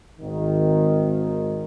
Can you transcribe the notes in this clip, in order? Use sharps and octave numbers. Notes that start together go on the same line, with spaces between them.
G#1 D#3